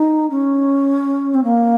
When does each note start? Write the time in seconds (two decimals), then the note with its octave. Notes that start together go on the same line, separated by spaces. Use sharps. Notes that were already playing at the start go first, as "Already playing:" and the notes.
Already playing: D#4
0.30 C#4
1.34 C4
1.43 A#3